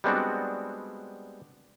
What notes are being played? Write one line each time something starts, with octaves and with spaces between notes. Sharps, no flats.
G3 G#3 B3 C4 D4 F#4